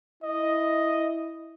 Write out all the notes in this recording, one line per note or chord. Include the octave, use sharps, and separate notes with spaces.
E4 D#5